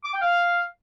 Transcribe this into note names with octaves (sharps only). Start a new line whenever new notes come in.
D6
G5
F5